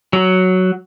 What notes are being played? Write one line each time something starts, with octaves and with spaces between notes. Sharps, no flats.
F#3